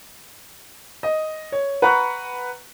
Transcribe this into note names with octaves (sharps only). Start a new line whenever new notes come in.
D#5
C#5
B4 F#5 A#5 B5 C#6 F#6